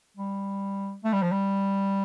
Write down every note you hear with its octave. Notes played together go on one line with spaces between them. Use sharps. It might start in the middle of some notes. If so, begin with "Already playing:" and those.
G3
A3
G3
F3
G3